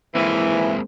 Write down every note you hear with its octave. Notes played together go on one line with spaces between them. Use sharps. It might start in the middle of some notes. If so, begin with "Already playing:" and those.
E3 G#3 A#3 C4